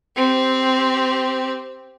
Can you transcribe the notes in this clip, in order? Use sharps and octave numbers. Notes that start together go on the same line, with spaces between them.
C4 G4